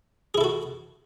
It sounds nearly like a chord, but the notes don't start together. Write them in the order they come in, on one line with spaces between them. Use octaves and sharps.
G#4 E4 A4 F#4